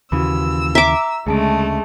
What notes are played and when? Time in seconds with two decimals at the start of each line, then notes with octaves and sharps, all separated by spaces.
0.12 D#2 C#3 E3 F#4 B5 E6
0.75 E5 A#5 D6
1.27 D2 C#3 G#3 A3 G#4 A5 D7